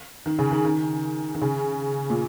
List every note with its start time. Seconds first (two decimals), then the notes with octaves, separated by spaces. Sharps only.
0.26 D#3
0.39 C#3
0.51 D#3
0.65 D#3
1.35 D#3
1.41 C#3
2.10 A#2